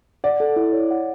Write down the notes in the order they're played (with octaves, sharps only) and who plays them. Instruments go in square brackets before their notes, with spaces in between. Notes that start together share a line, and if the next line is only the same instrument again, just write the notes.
[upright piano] D5 [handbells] F#5
[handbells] A4
E4
C#5
F#5